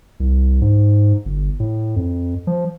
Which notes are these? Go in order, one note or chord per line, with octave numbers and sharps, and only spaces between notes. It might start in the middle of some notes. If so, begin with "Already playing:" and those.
C2
G#2
G1
A2
F2
F3